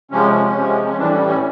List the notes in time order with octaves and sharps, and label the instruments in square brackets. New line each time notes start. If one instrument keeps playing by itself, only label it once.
[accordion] C3 F3 G#3 C#4
C#4
C3 F3 G#3
C#4
A2 E3 G3 D4
C#4
C#4